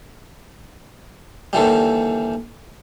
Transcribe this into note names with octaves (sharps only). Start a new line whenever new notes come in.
D#2 D3 E3 G3